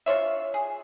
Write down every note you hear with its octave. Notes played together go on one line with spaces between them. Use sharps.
D4 F4 C#5 E5
G#4